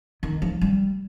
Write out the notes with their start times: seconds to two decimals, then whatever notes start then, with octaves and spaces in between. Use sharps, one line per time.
0.23 D#3
0.42 F3
0.61 G3